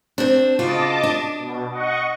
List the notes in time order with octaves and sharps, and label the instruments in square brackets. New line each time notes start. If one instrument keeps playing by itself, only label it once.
[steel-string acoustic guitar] C4 D4
[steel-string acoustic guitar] C#3 F4 F#4 [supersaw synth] D#5 A5 D6
[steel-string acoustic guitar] D4
[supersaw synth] B2
D#5 F#5 C#6